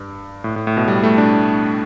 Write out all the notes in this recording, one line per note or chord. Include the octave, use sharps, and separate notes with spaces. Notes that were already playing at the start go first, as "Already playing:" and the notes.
Already playing: G2
A2
A2
A2
B2
G3
A3
D4